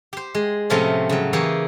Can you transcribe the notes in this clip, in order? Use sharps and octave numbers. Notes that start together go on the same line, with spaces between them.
G4 C5
G#3
A2 C3 F3 A3 C4 C#4
C#3 F#3
E3 A#3 G4 G#4 C#5